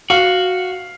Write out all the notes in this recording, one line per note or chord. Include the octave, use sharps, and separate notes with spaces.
F#4 F5